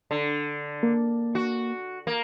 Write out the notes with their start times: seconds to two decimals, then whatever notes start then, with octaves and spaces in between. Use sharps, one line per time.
0.11 D3
0.83 A#3
1.35 F#4
2.07 A#3